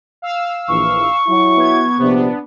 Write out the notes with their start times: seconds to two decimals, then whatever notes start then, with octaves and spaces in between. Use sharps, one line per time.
0.22 F5 E6
0.68 A#1 E3 C#6
1.27 F#3 E4
1.57 B3 G#6
1.99 A#1 C3 B3 D4